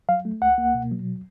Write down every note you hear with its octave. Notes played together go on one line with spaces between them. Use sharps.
F#3 F5
A3
C#2 F#5
A#3
B2
F#3